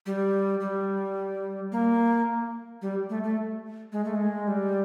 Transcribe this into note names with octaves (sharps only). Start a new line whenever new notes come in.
G3
G3
A#3
G3
A3
A3
G#3
A3
G#3
G3